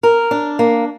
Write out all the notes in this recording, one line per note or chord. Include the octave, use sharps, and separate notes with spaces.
A#4
D4
A#3